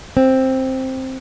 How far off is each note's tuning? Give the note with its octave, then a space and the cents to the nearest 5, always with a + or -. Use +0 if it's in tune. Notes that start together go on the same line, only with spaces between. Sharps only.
C4 +5